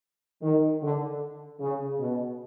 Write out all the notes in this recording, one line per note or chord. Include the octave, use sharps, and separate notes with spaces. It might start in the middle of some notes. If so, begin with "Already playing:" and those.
D#3
D3
C#3
B2